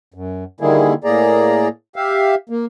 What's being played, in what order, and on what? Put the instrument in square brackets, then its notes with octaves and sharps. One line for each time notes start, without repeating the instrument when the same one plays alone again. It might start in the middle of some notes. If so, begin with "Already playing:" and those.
[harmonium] F#2
D3 D#3 G3 A#3 E4 G#4
A2 A#3 G#4 D5 A#5
G4 E5 F5
A#3